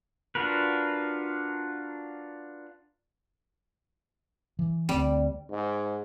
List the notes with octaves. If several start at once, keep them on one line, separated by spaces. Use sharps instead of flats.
D4 F4 F#4 A#4 B4
E3
D2 G3 B3 C4
G#2